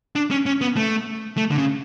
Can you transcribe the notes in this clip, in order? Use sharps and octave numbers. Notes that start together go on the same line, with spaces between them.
D4
C#4
C#4
B3
A3
A3
D3
C#3